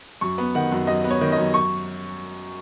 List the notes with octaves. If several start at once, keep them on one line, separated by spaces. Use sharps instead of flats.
F#2 C#6
B3
D#3 F#5
F#2
F#2 D#5
B3
C#5
D#3
D#5
F#2
C#6